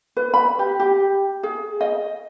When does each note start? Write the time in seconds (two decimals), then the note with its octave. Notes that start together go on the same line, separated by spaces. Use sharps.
0.17 B4
0.34 B5
0.59 G4
0.80 G4
1.43 G#4
1.81 D#5